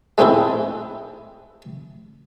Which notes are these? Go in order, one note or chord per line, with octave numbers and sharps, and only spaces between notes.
G#3 A3 C4 D#4 E4